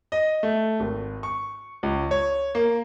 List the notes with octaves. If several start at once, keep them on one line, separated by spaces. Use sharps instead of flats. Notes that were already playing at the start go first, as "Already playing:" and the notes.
D#5
A3
G#1
C#6
C#2
C#5
A#3